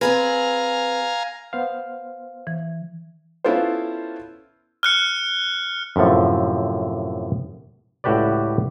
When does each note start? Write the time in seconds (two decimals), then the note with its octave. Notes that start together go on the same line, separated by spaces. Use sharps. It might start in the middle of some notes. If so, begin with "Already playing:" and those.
0.01 C4 G#4 B4 F5 G#5 A#5
1.53 B3 C5 F5
2.47 E3
3.45 B3 C#4 E4 F4 A4 C5
4.83 F6 F#6 C#7
5.96 F#2 A2 C3 F3
8.04 C#2 A2 F#4 G4 B4 D5